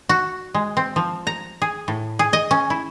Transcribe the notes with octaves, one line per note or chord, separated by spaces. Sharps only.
F#4
G#3
C4
F3
A#5
G#4
A2
G#4
D#5
C#4
E4